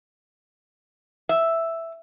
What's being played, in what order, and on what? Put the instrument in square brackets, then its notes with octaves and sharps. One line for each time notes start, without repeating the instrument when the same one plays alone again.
[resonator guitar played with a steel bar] E5